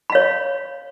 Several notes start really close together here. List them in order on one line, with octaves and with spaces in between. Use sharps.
B5 F5 C#5